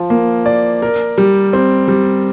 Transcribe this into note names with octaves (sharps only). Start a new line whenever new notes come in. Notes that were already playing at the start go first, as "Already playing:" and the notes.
Already playing: F3 F4
A#3
D5
A#4
G3
C4
G3